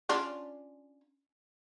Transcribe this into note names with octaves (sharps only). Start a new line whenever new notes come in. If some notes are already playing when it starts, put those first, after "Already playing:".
C#4 D4 F4